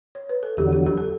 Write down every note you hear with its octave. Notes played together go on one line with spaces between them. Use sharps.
C#5
B4
A4
E2 D3 F#3 G4
G4
G4
A4